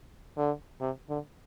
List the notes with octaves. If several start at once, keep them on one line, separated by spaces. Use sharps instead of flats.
D3
C3
D3